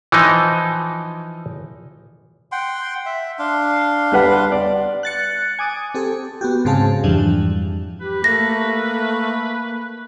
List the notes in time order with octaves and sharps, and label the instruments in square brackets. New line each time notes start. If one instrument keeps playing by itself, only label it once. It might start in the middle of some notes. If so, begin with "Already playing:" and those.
[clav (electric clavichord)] E3 F3 D#4
[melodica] F#5 G5 C6
E5
D4 F5 C6
[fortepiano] G3 B4 F#5
D5
[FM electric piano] F#6 A6 C#7
G#5 D6 D#6
C4 G4 A4
B3 F#4 G4
G#2 C#3 C4 G#4 F5 A5
F2 G#2 E3 F3 G3 D4
[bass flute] G4 [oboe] B4
[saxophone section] A3 [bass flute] A#3 [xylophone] A#6